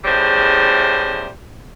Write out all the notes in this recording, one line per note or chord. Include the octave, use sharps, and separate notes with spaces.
E2 A2 C#3 G3 C5